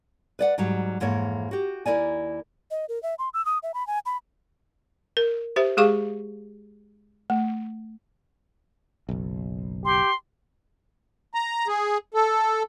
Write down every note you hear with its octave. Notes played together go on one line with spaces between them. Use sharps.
B4 D5 F#5
G#2 F#3 G3
F2 G#2 E3 A#3 C#5
F#4 G4
D#2 E4 A#4 D5 G#5
D#5
A#4
E5
C6
E6
D#6
E5
B5
G#5
B5
A#4
G4 C5 E5
G#3 G4 G#4 F5 C#6 D6
A3
F#1 B1
G4 C6
A#5
G#4
A4